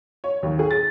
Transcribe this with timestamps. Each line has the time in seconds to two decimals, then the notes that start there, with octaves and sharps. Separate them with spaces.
0.24 C#5
0.43 D#2
0.59 G#4
0.71 A6